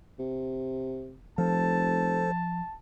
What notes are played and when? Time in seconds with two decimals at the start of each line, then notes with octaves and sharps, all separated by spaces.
0.19 C3
1.38 F1 F3 A4 C5 A5